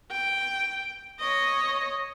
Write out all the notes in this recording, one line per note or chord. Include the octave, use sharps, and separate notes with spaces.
G5
C#5 D#5